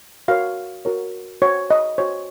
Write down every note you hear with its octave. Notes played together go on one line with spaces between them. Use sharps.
F#4 A#4 C#5 F5
F#4 A#4 C#5
F#4 C5 C#5
D#5
F#4 C5 C#5